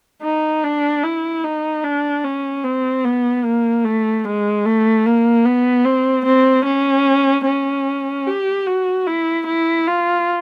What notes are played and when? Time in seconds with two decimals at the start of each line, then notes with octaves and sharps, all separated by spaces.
0.22 D#4
0.63 D4
1.03 E4
1.44 D#4
1.84 D4
2.24 C#4
2.64 C4
3.04 B3
3.44 A#3
3.85 A3
4.24 G#3
4.65 A3
5.05 A#3
5.45 B3
5.85 C4
6.26 C4
6.66 C#4
7.46 C#4
8.26 G4
8.66 F#4
9.06 E4
9.47 E4
9.87 F4